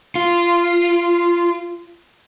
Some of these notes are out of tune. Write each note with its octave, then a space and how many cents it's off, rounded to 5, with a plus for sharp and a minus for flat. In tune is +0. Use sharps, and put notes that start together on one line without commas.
F4 -15